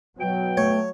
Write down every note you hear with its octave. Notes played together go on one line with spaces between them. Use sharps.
B2 F#3 G5
A3 C#5